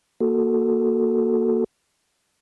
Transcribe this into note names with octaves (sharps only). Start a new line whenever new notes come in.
A#3 F#4 A4